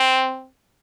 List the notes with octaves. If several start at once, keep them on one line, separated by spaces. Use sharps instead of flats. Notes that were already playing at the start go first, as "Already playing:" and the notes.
Already playing: C4